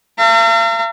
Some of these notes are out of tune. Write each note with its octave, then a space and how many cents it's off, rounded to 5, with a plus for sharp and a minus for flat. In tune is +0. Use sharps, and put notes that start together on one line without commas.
F5 -45 A#5 -40